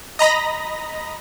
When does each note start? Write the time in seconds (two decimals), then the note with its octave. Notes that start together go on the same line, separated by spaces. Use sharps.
0.19 D#5 A#5 B5 A#6